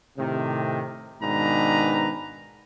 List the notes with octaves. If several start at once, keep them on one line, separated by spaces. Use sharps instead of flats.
A2 C3 D#3
G#2 B2 D#3 D4 B4 A#5